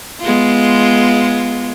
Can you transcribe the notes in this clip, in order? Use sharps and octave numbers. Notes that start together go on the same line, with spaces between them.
G#3 B3 F4